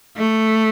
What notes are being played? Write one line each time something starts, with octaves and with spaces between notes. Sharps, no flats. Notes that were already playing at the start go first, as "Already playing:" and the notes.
A3